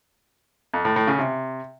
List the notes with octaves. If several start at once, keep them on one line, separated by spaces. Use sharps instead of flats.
F2
A2
A2
C#3
C3